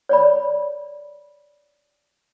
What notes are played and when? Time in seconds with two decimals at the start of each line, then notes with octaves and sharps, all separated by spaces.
0.09 C#5 D5 B5